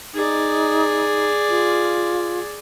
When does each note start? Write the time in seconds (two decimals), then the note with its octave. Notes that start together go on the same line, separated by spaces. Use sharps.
0.14 D#4 G#4 D5
1.49 F4